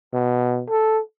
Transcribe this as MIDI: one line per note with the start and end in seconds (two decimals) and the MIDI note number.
0.13 0.63 47
0.70 1.00 69